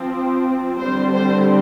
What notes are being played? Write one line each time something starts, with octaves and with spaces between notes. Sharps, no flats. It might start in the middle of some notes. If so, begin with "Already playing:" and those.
Already playing: F3 C4
D3 G3 C4 C5
C5